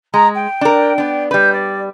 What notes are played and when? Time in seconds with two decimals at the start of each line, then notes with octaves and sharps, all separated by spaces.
0.14 G#3 A#5
0.35 G5
0.61 D4 A#4
0.98 B3 D4
1.31 G3 B4 G6
1.52 D5